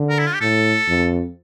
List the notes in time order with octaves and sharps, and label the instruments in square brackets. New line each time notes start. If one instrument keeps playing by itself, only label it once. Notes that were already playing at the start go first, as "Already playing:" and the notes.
Already playing: [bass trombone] D3
[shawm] A#4
E4
F4
G4
[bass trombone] A2 [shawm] A4
[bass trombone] F2